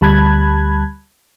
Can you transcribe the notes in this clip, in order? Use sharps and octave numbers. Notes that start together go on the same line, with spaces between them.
D2 G3 A5 B5 F#6 G#6